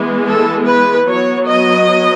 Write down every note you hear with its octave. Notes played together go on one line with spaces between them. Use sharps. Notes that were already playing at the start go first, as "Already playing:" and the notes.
Already playing: E3 G#3 B3
A4
B4
F#3 B3 C#5
D#5